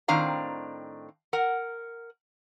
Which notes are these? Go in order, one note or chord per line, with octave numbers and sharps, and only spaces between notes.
A2 D#3 C4 D4 F5 A#5
A#4 F#5